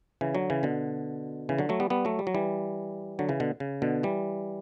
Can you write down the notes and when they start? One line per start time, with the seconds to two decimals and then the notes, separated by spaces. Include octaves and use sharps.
0.21 C#3 E3
0.35 D3 F#3
0.50 C#3 E3
0.63 B2 D3
1.49 C#3 E3
1.59 D3 F#3
1.69 F#3 A3
1.80 G3 B3
1.90 G3 B3
2.05 F#3 A3
2.19 G3
2.27 F#3
2.35 E3 G3
3.19 D3 F#3
3.29 C#3 E3
3.40 B2 D3
3.60 C#3
3.82 B2 D3
4.03 E3 G3